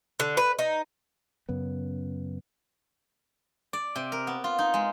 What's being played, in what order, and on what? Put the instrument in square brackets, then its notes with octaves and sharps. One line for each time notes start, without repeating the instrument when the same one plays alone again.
[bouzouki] D3
B4
D#4
[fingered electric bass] F#2 C#3 B3
[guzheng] D5
C3
A#4
B3
F4
D#4
G#3